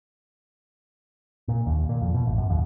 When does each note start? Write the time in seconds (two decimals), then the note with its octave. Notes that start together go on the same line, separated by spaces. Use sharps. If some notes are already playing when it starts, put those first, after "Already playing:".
1.48 A#2
1.66 D#2
1.89 A#2
2.01 F2
2.15 B2
2.26 A1
2.38 F#2
2.50 D#2